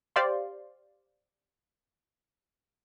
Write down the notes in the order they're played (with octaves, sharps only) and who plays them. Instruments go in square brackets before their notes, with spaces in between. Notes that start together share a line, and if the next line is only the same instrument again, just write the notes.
[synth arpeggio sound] G4 C5 D5 F5 C6